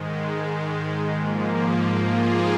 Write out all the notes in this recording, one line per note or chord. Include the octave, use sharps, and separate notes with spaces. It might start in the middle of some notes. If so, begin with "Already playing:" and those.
Already playing: G#2 D#3 G#3
G#2 F3 A#3
F4 G#4